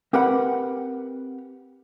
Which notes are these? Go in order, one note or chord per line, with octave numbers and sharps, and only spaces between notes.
C4 G4 A#4 B4 F#5 B5